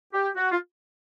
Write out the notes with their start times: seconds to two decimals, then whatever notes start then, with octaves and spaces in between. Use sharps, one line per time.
0.13 G4
0.35 F#4
0.51 F4